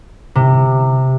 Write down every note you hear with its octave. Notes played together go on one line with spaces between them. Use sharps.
C3